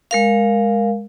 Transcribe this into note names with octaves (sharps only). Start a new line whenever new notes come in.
G#3 A#4 F5